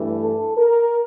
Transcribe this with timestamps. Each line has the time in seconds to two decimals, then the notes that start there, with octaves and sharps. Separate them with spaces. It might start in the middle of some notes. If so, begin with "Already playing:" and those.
Already playing: G2 E3 A3
0.21 A4
0.57 A#4